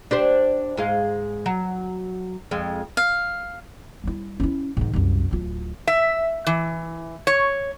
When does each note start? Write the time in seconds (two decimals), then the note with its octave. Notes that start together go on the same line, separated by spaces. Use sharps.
0.11 D4 G4 C5
0.77 G#2 G#3 F5
1.46 F#3
2.51 F2 G#3
2.97 F5
4.04 G3 E4
4.40 C#4 E4
4.77 G#2 D#3
4.94 C2 F#2
5.31 D1 F4
5.87 E5
6.47 E3
7.27 C#5